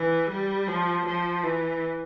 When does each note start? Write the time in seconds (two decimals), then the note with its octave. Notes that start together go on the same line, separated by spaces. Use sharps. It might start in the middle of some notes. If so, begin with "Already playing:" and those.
Already playing: E3
0.31 G3
0.68 F3
1.06 F3
1.43 E3